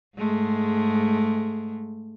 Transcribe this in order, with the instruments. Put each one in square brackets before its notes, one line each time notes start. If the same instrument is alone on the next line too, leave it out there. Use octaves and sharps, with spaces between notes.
[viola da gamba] G#2 G#3 A3